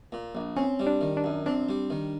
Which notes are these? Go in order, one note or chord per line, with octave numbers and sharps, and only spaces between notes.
A#2
A#1
C4 C#4
G3
D4
D#3
D4
F#2
C4 D4
G3
D#3